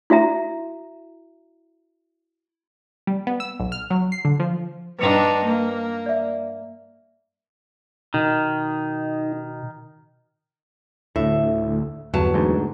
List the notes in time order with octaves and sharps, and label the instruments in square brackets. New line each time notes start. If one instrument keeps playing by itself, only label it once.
[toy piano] E4 F#4 E5 A#5
[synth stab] G3
B3
E6
B1
F6
F#3
C7
D3
F3
[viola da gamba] G2 D4 D#4 [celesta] B4 C#7 F7
[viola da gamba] A#3
[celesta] D5 E5
[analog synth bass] B2 [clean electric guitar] D#3 [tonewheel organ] D#4
[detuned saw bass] D2 [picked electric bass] A2 [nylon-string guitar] E5
[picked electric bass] G1 [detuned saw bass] E2 [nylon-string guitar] F#3 B3 A5
[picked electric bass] D2 G#2